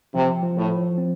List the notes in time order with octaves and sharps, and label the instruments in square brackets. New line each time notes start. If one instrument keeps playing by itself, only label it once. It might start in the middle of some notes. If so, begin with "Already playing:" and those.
[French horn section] C3 [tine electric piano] F3
[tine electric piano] F3
[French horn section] A2
[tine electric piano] F3
C4